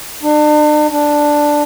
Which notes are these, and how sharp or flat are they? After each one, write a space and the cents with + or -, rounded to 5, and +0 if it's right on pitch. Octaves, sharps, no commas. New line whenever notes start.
D4 +40
D4 +5